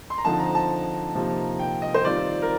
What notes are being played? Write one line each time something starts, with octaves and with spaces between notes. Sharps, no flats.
C6
A#5
D3 F3 C4 D#4 A5
A#5
A5
C3 F3 A#3 D#4
G5
D#5
C5
D#3 G3 C4 F4 D5
A#4